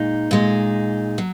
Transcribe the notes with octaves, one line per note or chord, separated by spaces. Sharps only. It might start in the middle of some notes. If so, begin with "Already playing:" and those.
Already playing: A#2 G#3 D#4
A#2 G#3 D#4
F#3